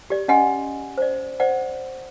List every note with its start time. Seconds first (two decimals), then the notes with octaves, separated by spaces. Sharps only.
0.10 G4 D5
0.28 C#4 D#5 F#5 G#5 C6
0.98 C5 D5
1.40 C5 D5 F#5